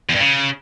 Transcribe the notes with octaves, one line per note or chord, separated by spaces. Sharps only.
E2
G2
C#3